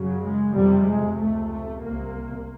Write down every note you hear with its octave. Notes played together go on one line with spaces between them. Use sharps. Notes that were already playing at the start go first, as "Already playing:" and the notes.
Already playing: F#2 C#3 F#3
G#3
F2 C3 G3
G#3
C#2 C3 A3
A3
C2 C3 A#3